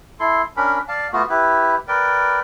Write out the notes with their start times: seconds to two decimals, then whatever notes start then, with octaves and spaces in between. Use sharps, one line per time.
0.20 E4 A4 C6
0.57 C#4 D4 A#4 B5
0.88 D5 F5 A5
1.13 A3 B3 F4 F#4
1.29 E4 G4 B4
1.88 A#4 B4 D5 G5